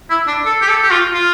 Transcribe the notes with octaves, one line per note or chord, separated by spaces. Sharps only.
E4
D4
A4
G4
A4
G4
F4
F4